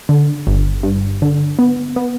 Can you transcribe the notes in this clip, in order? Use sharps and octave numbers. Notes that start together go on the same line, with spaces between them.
D3
G1
G2
D3
B3
B3